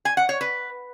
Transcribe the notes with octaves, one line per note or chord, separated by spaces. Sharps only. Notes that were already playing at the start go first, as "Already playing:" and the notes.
G#5
F#5
C#5
B4